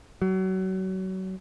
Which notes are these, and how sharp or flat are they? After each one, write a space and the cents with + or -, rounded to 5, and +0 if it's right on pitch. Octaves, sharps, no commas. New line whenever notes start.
F#3 +30